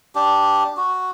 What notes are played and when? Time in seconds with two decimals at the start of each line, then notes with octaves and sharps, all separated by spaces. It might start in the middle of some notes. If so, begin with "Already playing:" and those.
0.15 D4 G4
0.77 F#4